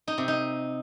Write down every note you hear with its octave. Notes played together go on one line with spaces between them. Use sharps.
D#4
C3
D#4